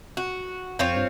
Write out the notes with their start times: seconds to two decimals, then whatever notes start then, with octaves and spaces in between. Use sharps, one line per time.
0.17 F#4
0.79 F2 C4 F4 C#5
0.96 G2